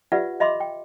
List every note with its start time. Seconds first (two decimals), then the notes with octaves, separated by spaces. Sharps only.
0.12 F4 G4 B4 D5 E5 F#5
0.40 D#5 E5 B5 C6 D6
0.60 G5